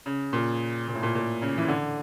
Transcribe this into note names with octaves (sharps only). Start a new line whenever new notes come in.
C#3
A#2
A#2
A2
A#2
A#2
C#3
E3
D3